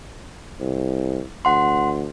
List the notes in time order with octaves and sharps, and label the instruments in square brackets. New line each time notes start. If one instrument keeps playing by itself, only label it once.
[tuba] C2
[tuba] D2 [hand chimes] F#5 C6